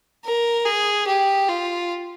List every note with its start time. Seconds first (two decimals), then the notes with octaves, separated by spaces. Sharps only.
0.25 A#4
0.65 G#4
1.07 G4
1.48 F4